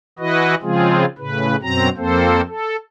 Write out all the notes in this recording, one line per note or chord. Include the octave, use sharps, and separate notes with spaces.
E3 E4 F#4 B4 D#5
C#3 F3 G#3 C4 F4 G#4
A2 C#3 B4
F#2 B2 F#3 C4 A#5
F2 A#3 C4 A4 C5
A4